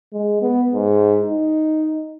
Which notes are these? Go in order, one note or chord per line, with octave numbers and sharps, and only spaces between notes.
G#3
B3
G#2
D#4